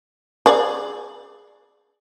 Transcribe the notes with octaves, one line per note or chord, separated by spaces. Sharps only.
G#4 D5